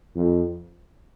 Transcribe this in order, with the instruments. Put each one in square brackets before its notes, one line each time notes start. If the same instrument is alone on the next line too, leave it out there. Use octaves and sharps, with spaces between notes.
[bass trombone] F2